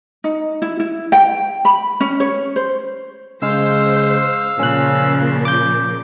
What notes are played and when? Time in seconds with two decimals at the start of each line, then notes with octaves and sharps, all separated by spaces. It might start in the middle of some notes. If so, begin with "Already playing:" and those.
0.24 D#4
0.62 E4
0.80 E4
1.12 G5
1.65 B5
2.00 C#4
2.20 C#5
2.56 C5
3.42 C#3 G#3 C5 F5 E6
4.59 A#2 C#3 F3 C#4 F#6
5.45 D6 G6